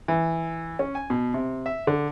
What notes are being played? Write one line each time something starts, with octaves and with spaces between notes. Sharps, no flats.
E3
C#4
G#5
B2
C3
E5
D3